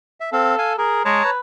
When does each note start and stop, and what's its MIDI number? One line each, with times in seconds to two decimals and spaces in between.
0.20 0.30 76
0.33 0.55 60
0.33 0.74 69
0.33 0.55 77
0.58 0.73 77
0.58 0.73 80
0.78 1.02 68
0.78 1.02 70
1.05 1.23 56
1.05 1.30 73
1.05 1.30 81
1.05 1.30 82
1.24 1.40 71